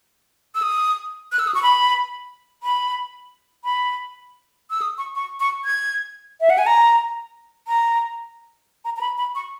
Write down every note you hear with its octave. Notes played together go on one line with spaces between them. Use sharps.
E6
D#6
F#6
E6
D#6
C#6
B5
B5
B5
E6
D#6
C#6
C#6
C#6
G#6
E5
F#5
G#5
A#5
A#5
A#5
A#5
B5
B5
C#6